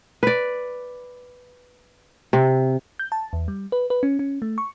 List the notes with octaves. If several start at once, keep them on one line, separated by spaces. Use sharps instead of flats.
B4 D5
C3
G6
A5
E2
G3
B4
B4
C#4
C#4
A3
C#6